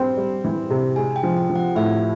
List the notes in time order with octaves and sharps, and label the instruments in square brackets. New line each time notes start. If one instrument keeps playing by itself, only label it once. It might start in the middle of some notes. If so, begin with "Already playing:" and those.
Already playing: [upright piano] G3 C4 [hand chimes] G5
[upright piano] G3
E3
C3
[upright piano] G#3 [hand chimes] G#5
[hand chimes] G5
[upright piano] F3
[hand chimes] G5
[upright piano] F3
[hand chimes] F#5
[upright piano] A2 [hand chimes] E5